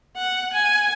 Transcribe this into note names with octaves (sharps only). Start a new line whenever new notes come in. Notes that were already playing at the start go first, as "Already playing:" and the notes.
F#5
G#5